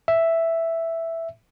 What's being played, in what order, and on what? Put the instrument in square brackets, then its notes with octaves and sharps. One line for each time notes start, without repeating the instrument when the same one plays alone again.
[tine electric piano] E5